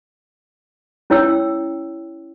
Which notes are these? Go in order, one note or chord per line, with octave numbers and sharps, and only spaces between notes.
C#4 E4 C#5 G5 E6